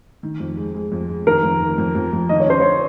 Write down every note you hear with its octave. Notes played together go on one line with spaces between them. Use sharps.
D#3
F2
G#3
G#3
F2
G#3
D#3 A#4
F2
D#3
F2
F2
F2
D#3 D#5
C#5
C#4 C5
C#4 C#5